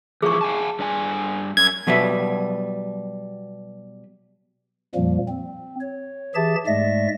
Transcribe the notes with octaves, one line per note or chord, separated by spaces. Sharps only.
E3 F3 E4 G#4 C#6
F5 G#5 A5
G2 D5 G#5
F#2 G#6
B2 F#3 G3 B4 E5
F2 A#2 F3 G3 A#3
C4
C#5
E3 G4 G#4 E5 A5 A6
G#2 G#3 A3 D5 E5 A#6